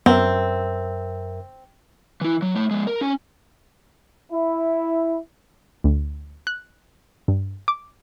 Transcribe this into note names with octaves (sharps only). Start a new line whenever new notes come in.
F#2 B3 C4 A#4 E5
E3 E4
F#3
A3 C#5
F3 G#3
A#4
C#4 G#5
E4
D2
F#6
G2
D6